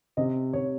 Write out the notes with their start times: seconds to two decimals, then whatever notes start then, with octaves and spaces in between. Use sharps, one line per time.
0.17 C3 D#5
0.53 C3 C#5